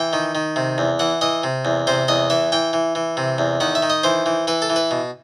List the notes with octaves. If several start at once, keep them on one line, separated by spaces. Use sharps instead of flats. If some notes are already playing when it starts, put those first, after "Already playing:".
Already playing: E3 G5
D#3
D#3
C3
E2
E3 F#5
E3 D#5
C3
E2
C3 C5
E2 D#5
E3 E5
E3 G5
E3
E3
C3
E2
D#3 F#5
E5
D#3
D#5
E3 C5
E3
E3 B4
A4
E3
B4
B2